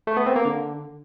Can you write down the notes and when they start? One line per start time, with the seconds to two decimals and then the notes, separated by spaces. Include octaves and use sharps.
0.07 A3
0.17 B3
0.26 C4
0.36 A#3
0.45 D3